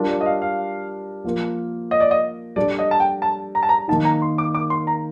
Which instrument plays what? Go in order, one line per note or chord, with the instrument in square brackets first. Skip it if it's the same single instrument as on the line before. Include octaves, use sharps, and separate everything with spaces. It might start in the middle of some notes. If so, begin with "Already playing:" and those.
Already playing: [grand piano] G3 D4 F4 A#4
[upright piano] D5
D#5
F5
F5
[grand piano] F3 A#3 F4 A#4
[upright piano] D#5
D5
D#5
[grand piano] G3 D4 A4 [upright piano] D5
[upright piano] D#5
A5
G5
A5
A#5
A5
A#5
[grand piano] D#3 A#3 D#4 [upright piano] A5
[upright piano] A#5
C6
D6
D6
C6
A#5